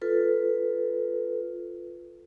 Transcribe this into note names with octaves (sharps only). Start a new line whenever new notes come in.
F4 A4 B4